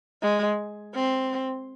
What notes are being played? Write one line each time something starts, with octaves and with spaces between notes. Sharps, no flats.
G#3
C4